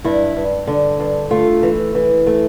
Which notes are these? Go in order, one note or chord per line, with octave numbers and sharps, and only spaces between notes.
G2 E4
G2
D3
G2
A3 F4
E3
E3
A3